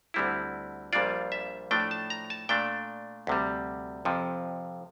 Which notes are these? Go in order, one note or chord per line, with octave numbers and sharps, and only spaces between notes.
D2 D3 G3 C4 E4
A#1 A#2 G3 D4 F4 D5
E5
A2 F3 A3 D4 G5
A5
A#5
A5
A#2 A3 D4 G5
D2 C3 G3
F2 C3 F3